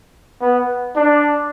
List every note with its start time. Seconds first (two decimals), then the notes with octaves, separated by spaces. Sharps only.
0.42 B3
0.96 D4